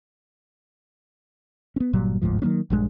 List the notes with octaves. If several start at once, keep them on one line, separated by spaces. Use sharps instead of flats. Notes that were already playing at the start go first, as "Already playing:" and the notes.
B3 C#4
G1 A#2 F#3 G3
G1 D2 G#2 F3
D#3 F#3 A#3 C#4
A#1 G2 G#3